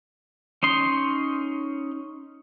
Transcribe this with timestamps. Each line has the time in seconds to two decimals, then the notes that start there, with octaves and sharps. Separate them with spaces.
0.63 C#4 D#4 C6